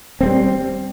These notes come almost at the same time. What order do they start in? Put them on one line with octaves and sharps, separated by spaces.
C4 A3 G3